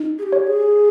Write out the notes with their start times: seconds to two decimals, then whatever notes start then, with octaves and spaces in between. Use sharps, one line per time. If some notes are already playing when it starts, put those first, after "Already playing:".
Already playing: D#4
0.19 G#4
0.23 G4
0.32 C#5
0.47 G#4